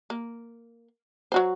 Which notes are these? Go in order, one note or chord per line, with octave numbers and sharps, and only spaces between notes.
A#3
F#3 F#4 C5